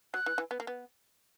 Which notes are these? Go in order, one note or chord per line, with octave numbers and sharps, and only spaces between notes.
F#3 F#6
E3
E3
B3
A#3
B3